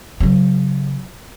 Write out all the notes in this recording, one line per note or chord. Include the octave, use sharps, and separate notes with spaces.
C#3 F#3